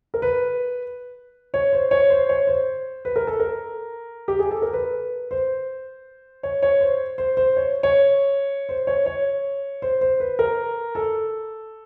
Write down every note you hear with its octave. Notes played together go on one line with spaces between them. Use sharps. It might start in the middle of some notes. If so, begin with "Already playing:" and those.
A#4
B4
C#5
C5
C#5
C5
C#5
C5
B4
A#4
A4
A#4
G4
G#4
A4
A#4
B4
C5
C#5
C#5
C5
C5
C5
C#5
C#5
C5
C#5
C#5
C5
C5
B4
A#4
A4